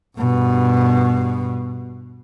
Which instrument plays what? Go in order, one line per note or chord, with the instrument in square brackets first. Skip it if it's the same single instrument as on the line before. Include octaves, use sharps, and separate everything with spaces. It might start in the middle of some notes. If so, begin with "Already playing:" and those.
[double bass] G2 B2